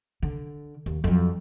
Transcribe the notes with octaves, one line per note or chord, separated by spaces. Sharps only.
D3
D#2
F2 F#3